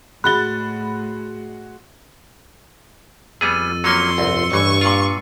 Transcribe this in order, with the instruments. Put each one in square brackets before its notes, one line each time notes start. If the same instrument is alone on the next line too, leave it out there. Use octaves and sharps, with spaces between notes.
[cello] A2 [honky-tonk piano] G#3 F#4 A6 [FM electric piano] B5 [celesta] F#6 G7
[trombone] F2 [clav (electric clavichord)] G3 B3 G#4 [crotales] E6 A6 D#7
[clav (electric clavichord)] F#3 A#3 C#4 [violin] C6 [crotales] C#7
[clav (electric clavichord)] G1 C2
[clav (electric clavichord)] A1 E3 [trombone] G2 [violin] C#6
[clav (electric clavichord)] A#2 F4 [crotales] C7